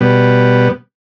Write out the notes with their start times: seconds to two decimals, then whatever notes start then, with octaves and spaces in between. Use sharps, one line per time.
0.01 B2 G3 B3